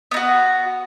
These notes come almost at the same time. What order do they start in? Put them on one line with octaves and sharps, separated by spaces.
B3 D#4 F#4